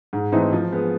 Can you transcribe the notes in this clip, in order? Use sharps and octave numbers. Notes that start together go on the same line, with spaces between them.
G#2
E3 A3 C4 D#4
F3
G#3 B3